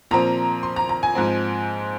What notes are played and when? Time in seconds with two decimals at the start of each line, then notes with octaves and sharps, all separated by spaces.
0.11 A#2 F3 C4 A#5
0.63 C6
0.76 A#5
0.89 A#5
1.03 G#5
1.15 G#2 F3 C4